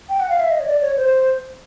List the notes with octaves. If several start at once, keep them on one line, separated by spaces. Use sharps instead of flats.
G5
F#5
F5
E5
D#5
C#5
D5
C#5
C5